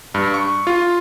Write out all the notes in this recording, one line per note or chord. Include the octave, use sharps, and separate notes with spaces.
G2
C#6
F4